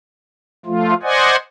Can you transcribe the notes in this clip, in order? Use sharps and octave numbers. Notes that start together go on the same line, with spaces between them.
F3 A3 F4
C5 D5 D#5 F#5 G#5